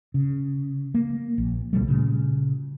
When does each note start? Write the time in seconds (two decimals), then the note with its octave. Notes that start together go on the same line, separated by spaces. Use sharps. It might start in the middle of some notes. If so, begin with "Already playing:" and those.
0.14 C#3
0.94 A#3
1.38 A#1
1.73 C#2 B2 G3 A3
1.88 A#2 C#3